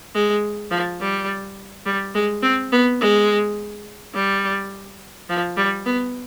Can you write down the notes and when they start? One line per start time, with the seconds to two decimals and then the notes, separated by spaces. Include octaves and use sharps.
0.15 G#3
0.71 F3
1.01 G3
1.86 G3
2.15 G#3
2.42 C4
2.72 B3
3.00 G#3
4.14 G3
5.30 F3
5.57 G3
5.86 B3